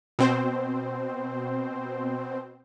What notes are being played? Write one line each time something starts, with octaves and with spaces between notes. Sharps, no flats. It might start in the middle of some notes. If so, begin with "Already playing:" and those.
B2 C4 C5